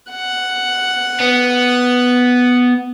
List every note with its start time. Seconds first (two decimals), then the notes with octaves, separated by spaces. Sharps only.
0.11 F#5
1.20 B3